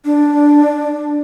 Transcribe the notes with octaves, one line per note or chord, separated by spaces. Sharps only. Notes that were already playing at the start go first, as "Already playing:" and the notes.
D4